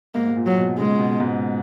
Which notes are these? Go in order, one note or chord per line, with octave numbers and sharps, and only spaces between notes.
G#2 A#3
G#2
A#2
F#3
B2
C#3 G#3
B2
G#2